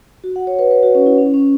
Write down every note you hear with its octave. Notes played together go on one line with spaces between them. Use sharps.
F#4
F#5
C#5
B4
B4
F#4
C#4
E4
C#4
C#4